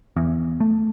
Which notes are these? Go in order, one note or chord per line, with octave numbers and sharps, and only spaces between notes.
E2
A3